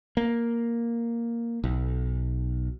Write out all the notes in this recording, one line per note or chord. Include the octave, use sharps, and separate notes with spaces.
A#3
B1